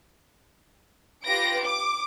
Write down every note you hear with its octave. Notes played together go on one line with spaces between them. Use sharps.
F4 G4 B4 A#6 D7
D6